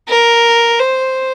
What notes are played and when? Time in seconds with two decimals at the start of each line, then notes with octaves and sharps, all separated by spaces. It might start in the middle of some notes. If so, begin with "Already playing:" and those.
0.09 A#4
0.79 C5